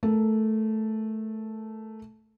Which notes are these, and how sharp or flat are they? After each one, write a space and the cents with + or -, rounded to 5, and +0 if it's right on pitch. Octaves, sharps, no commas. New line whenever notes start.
A3 -10 A#4 -15